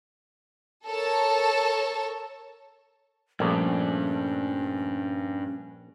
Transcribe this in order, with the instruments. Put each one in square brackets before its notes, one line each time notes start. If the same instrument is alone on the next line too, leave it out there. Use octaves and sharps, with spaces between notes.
[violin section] A4 A#4 C#5 A5
[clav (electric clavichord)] A#1 [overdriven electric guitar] G2 [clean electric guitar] F3 A3 [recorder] C#4